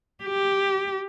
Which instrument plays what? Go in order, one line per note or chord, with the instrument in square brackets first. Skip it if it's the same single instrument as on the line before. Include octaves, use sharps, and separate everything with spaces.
[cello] G4